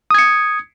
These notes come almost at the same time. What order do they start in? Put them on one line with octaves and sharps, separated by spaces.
D#6 G#6 C#7